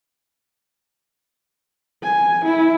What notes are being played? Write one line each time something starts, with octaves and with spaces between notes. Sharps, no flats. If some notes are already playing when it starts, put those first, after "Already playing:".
G#5
E4